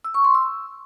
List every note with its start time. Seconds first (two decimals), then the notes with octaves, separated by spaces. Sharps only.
0.04 E6
0.14 C#6
0.24 C6
0.34 E6